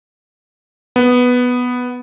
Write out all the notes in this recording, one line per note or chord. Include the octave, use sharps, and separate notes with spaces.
B3